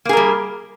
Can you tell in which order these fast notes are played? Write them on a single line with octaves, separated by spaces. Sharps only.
A#3 G#4 A#4 G3